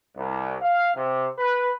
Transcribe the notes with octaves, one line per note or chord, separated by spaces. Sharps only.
C2
F5
C3
B4